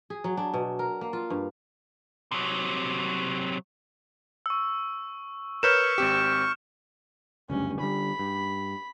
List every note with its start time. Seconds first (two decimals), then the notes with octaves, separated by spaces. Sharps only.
0.10 G#4
0.24 F#3
0.37 D4
0.54 B2
0.79 A#4
1.01 A#3
1.13 F4
1.30 G2
2.32 C3 F#3
4.46 C#6 E6
5.63 A#4 B4 C#5 C#6 F6 G6 E7
5.98 G#1 C4 G4
7.50 F#1 D2 G2 C#4
7.80 D3 G3 B5
8.19 G2